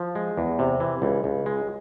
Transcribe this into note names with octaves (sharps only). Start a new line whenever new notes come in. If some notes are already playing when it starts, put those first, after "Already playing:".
Already playing: F3
G#3
E2
C3
E3
C#2
C#2
G#3